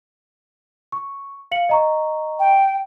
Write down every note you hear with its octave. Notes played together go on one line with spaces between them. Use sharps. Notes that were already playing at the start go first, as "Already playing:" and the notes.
C#6
F5 C#7 F#7
D#5 A#5 C#6
G5